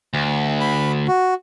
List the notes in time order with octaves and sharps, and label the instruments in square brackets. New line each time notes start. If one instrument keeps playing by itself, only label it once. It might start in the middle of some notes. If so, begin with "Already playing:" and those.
[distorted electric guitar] D2
[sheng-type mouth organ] B5
F#4